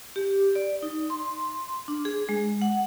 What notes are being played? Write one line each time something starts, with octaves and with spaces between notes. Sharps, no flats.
G4
D5
D#4
C6
D4
G#4
G#3
F#5